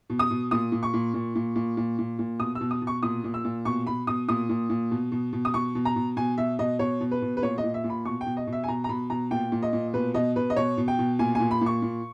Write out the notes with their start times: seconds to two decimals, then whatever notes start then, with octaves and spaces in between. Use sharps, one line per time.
0.10 B2
0.19 D#6
0.30 B2
0.51 A#2 D#6
0.72 A#2
0.83 C#6
0.94 A#2
1.14 A#2
1.35 A#2
1.56 A#2
1.77 A#2
1.99 A#2
2.19 A#2
2.40 B2 D#6
2.55 E6
2.61 B2
2.71 D#6
2.82 B2
2.87 C#6
3.03 A#2 D#6
3.24 A#2
3.34 E6
3.45 A#2
3.65 B2 C#6
3.87 B2 B5
4.07 B2 D#6
4.28 A#2 D#6
4.49 A#2
4.70 A#2
4.91 B2
5.12 B2
5.33 B2
5.45 D#6
5.54 B2 C#6
5.75 B2
5.85 A#5
5.96 B2
6.17 B2 G#5
6.38 B2 E5
6.59 B2 D#5
6.79 B2 C#5
7.01 B2
7.11 B4
7.22 B2
7.37 B4
7.42 A#2 C#5
7.58 D#5
7.64 A#2
7.74 E5
7.84 A#2
7.89 B5
8.05 B2 C#6
8.21 G5
8.26 B2
8.37 D#5
8.47 B2
8.53 E5
8.64 G#5
8.68 B2 A#5
8.84 A#5
8.89 B2 B5
9.10 B2 A#5
9.31 A#2 G5
9.52 A#2
9.63 D#5
9.73 A#2
9.94 B2 B4
10.14 B2 D#5
10.36 B2 B4
10.50 D#5
10.56 B2 C#5
10.78 B2
10.88 G5
10.99 B2
11.19 A#2 G#5
11.35 A#2 G#5
11.51 B5
11.61 A#2 C#6
11.82 A#2